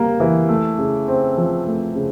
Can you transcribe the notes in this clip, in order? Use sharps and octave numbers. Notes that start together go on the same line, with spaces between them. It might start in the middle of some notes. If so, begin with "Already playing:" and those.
Already playing: G3 A#3
E3
A3
C#3
C4
F3
A3
C#3